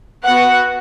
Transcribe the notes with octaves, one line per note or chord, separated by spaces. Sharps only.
B3 F#4 F#5